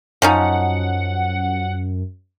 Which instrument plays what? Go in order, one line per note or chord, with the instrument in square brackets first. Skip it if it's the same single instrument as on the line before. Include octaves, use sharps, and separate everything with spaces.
[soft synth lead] F#2 [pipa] F3 C#4 D#4 [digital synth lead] F#5